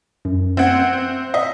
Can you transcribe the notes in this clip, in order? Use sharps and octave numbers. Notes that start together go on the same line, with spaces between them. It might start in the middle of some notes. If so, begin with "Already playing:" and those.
F#2
C4 E5 F#5 G#6
D#5 E5